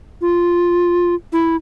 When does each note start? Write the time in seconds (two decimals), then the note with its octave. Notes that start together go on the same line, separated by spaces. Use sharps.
0.21 F4
1.33 E4